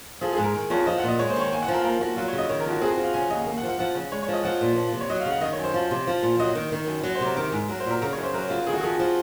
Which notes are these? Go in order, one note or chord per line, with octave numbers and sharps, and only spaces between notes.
F3 G#4
G#4
G#2
A#4
D#3
F2 C#5
F3 D#5
F#5
A#2 D#5
G#3 C#5
C5
D#3 C#5
A#3 G#5
F#5
F3
A#4
A#3 A#4
F3 F#4
F#3 F4
C#5
C#3
D#5
D#3 C#5
A#4
F2 F#4
C4 G#4
F#4
F3
F5
C#3 G#5
D#2 D#5
A#3
F#5
F3
F#5
F3 F#5
C#3
G#3 C#5
C#5
F3 D#5
F3 F#5
A#2
F3
C3
C#5
F#3 D#5
F5
C#3
F#5
D#3 D#5
C#5
F#2
C5
F3
C3
F3
A#2
F#3 D#5
D#3
D#3
F#2
F#3
C5
C3
A#4
D#3 A#4
G#2
F#3 A#4
C5
A#2
A#4
C#3 A#4
C#5
F#2
C5
F#3 A#4
C#3 F4
D#3 G#4
F#4
F2 G#4
F3